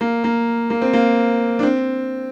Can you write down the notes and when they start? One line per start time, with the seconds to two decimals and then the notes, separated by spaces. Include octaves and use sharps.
0.01 A#3
0.24 A#3
0.70 A#3
0.82 C4
0.93 A#3
1.59 D4
1.63 C4